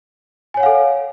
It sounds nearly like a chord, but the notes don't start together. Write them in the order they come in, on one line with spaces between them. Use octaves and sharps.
G#5 C#5 F#5 F5 A4